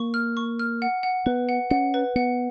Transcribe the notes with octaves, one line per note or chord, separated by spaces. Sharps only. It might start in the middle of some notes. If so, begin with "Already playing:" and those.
Already playing: A#3 C#6
F6
C#6
F6
F#5
F#5
B3 B4
F#5
C#4 F#5
B4
B3 F#5